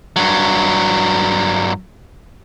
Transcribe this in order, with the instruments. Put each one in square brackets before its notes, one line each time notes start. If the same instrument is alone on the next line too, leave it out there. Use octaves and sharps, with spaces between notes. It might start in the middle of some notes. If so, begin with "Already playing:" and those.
[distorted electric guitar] G2 F#3